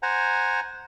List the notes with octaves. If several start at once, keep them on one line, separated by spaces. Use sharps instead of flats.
C5 F#5 G#5 A#5